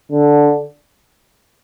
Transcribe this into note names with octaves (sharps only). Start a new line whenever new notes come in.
D3